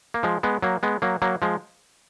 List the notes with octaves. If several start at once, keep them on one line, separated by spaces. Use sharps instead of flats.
A#3
F3 G#3
G#3 B3
F#3 A#3
G#3 B3
F#3 A#3
F#3 A#3
F3 G#3